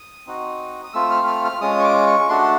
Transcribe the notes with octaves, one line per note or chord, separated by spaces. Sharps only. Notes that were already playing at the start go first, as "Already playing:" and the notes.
Already playing: D#6
C4 D#4 F#4
D#6
A3 C4 F4 E6
F6
F6
F6
G#3 C#4 F4 D#6
C#6
D6
C#6
A3 D4 F#4 C6